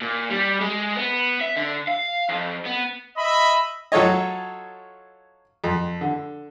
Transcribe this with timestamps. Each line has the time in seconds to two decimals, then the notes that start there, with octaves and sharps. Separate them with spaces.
0.02 A#2
0.30 G3
0.61 G#3
0.97 B3
1.41 E5
1.56 D3
1.88 F5
2.29 F2
2.66 B3
3.16 D#5 E5 B5
3.92 F#3 F4 A4 C#5 D#5
5.64 F2
6.01 D3